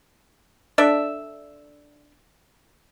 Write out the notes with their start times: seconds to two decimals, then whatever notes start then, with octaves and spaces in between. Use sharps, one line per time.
0.78 D4 A4 D5 E5